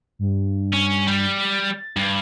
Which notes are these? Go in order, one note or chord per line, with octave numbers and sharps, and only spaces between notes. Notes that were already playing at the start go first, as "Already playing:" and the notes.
G2
C#4
G3
A6
G2